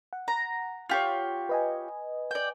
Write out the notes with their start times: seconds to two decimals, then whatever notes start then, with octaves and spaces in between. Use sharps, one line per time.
0.13 F#5
0.28 A#5
0.90 F4 G4 C#5
1.49 B4 D#5 G#5
2.31 D5 G5